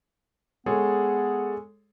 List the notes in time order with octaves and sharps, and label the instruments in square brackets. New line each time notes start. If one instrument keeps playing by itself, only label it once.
[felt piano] G#3 [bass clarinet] B3 [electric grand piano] G#4 A4 C#5